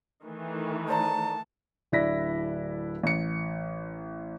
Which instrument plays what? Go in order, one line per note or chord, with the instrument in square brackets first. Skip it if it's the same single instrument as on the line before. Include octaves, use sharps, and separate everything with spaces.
[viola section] D#3 E3 A3
[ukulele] C5 D5 A#5 [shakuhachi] A5
[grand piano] D1 D4 E4 A#6 B6
A1 C#7